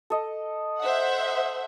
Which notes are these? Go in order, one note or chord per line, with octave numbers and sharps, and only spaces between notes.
A4 D#5
C5 E5 F#5